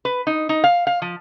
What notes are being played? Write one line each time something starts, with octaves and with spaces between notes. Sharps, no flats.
B4
D#4
D#4
F5
F5
F3